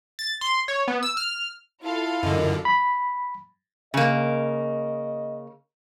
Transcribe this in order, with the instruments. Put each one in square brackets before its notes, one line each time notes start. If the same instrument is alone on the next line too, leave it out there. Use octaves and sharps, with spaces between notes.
[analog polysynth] A6
C6
C#5
B3
E6
F6
[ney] E4 [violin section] F4 A4 F5
[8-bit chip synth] F#2 D3 [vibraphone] A#4 D#5
[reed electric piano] B5
[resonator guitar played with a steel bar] C#3 A#3 [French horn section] D#5